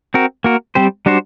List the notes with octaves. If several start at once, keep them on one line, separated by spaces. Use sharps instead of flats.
C4 F#4 A#4
A#3 F#4 A#4
G3 C4 G4 C5
G3 D4 F#4 C5